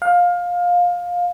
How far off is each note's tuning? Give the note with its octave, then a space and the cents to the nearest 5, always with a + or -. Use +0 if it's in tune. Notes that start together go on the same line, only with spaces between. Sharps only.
F5 +20